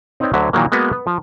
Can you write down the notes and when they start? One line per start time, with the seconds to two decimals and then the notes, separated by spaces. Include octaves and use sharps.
0.20 C4 D#4 B4 C#5 D5 G5
0.33 D2 D3 F#3 E5
0.53 A#2 D#3 E3 F#3 A#3
0.72 G#3 A#3 B3 F#4 B4
0.92 B3
1.07 F3